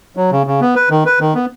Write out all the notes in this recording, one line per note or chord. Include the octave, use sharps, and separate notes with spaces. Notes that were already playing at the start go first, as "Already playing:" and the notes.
F#3
C#3
C#3
B3
B4
D#3
B4
D#3
B3